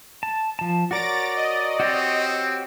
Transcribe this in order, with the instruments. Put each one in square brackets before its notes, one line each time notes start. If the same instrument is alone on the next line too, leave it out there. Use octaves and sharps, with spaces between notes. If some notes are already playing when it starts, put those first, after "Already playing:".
[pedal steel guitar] A5
F3 A5
[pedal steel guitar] F#4 A#4 C#5 [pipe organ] D5 [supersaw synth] A6 A#6 D7
[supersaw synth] D#5
[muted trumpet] C4 [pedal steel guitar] F#4 G4 C#5